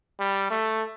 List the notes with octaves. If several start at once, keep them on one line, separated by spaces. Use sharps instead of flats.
G3
A3